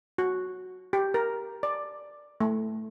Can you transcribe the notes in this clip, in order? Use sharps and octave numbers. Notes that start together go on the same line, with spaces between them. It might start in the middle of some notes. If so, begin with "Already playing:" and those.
F#4
G4
A#4
D5
A3